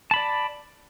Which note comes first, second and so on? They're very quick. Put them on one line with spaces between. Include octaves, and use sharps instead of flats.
A5 B5 D5